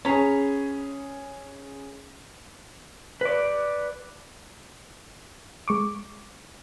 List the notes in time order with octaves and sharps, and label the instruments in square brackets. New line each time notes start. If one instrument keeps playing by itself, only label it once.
[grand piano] C#4 G#4 [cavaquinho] C#5 A#5 B5
[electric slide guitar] B4 D5
[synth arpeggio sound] G#3 C#6 D6